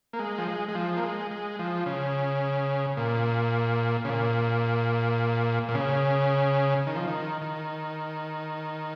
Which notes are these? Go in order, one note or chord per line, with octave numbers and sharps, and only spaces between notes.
A#3
G#3
F3
G#3
G#3
F3
A#3
G#3
G#3
F3
C#3
A#2
C#3
A#2
A#2
C#3
D#3
F3
D#3
D#3